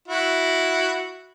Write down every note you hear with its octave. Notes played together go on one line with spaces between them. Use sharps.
E4 F#4